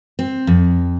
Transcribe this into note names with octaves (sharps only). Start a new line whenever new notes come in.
C4
F2